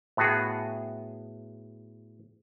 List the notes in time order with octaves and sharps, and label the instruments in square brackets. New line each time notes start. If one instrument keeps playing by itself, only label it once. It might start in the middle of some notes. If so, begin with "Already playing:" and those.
[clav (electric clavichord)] A2 B3 F#4 G#4